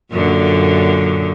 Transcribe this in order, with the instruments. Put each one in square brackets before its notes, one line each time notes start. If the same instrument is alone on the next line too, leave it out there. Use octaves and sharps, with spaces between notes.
[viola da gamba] F#2 A#2 D3